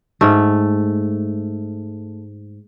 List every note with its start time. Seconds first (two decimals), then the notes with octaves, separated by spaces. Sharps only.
0.21 G#2 A3